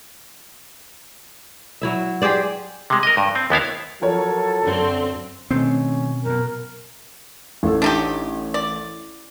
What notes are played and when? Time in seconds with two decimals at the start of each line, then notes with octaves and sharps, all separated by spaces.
1.82 F#3 E4 E5
2.22 G4 G#4 C5 D5
2.90 C3 G#3
3.03 A#4 D#5
3.17 G2
3.35 C4
3.50 D#2 B3 E4 F5
4.01 F3 F#3 A4 A#4 C#5
4.63 F#2 D3 C4
5.51 B2 D#3 A3 C4 C#4 C5
6.25 F#2 B2 A#4
7.63 A1 A4
7.82 D4 D#4 G4
8.54 D5